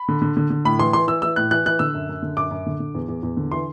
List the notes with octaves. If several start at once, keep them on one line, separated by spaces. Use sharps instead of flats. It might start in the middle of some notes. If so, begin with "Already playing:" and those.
Already playing: B5
D3
D3
D3
D3
A2 B5
E3 C6
E3 C6
E3 E6
E3 E6
A2 F#6
E3 F#6
E3 F#6
D3 E6
F#2
F#2
D3
F#2 D6
F#2
D3
D3
E2
E2
E2
D3
E3 C6